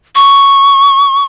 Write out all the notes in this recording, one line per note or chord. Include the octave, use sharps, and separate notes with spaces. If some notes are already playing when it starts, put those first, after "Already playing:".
C#6